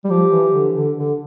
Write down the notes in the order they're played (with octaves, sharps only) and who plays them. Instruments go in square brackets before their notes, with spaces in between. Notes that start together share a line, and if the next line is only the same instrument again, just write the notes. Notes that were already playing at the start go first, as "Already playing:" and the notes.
[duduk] G3
[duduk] F3 [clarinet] G4
[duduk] E3
D3
D3
D3